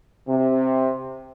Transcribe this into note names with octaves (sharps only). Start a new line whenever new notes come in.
C3